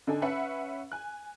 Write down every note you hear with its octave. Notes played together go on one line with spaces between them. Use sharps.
D3 D#4 A4 G#5
C#4 B4 E5 F#5
G#5 F#6